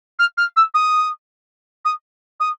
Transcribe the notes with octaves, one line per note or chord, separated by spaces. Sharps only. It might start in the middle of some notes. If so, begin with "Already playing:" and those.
F6
F6
E6
D#6
D#6
D#6